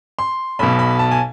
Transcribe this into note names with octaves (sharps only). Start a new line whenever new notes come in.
C6
B1 B2 B5
B5
A5
G#5